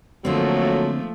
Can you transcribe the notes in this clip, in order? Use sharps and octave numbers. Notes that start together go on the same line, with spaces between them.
F#2 D3 F3 F#3 A3 A#3 C4